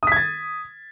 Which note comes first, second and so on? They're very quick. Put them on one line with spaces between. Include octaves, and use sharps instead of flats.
D#6 B6 G#6 A6